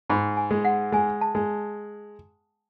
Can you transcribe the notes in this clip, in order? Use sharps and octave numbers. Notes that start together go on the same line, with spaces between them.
G#2 B5
G#5
G#3
F#5
G#3 G#5
A5
G#3